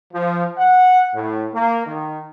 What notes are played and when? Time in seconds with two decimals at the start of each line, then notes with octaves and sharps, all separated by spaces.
0.13 F3
0.57 F#5
1.14 A2
1.53 A#3
1.85 D#3